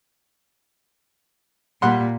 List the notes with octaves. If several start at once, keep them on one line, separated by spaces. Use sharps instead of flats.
A#2 G3 F#5 C6